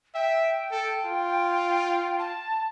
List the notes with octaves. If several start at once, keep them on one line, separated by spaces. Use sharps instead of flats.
E5 G5
A4
F4
A5